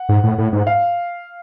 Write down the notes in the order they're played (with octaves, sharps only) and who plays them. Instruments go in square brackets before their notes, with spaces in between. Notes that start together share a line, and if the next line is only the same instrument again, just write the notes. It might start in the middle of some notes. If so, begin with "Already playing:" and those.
Already playing: [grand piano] F#5
[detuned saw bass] G#2
A2
A2
G#2
[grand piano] F5